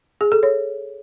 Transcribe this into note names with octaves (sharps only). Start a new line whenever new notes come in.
G#4
A4
C#5